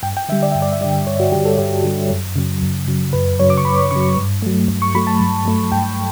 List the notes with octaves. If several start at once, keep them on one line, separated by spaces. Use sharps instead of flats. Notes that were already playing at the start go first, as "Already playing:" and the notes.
G2 G5
G5
D3 G3 E5
D5
G2 E5
D5
E5
D3 G3 D5
G2 C#5
F#4
D3 G3 G4
A4
G2 G4
D3 G3
F#2
C#3 F#3
F#2
C#3 F#3
F#2 B4
C#3 F#3 C#5
D6
C#6
F#2 B5
C#3 F#3 C#6
G2
F#3 A3
G2
C#6
F#3 A3 B5
A5
G2
F#3 A3
G2 G5